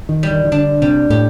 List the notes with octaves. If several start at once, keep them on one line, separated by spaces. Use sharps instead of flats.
D#3
G3
D#3
D#3
D3 D4
C3 G3
A2 G4